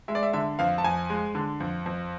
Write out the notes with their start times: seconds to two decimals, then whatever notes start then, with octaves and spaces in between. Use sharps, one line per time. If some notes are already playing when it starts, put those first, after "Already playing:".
0.08 G#3 E5
0.15 D5
0.23 E5
0.33 D3 E5
0.59 F2 F5
0.78 A5
0.84 F2 G#5
1.10 G#3
1.35 D3
1.60 F2
1.86 F2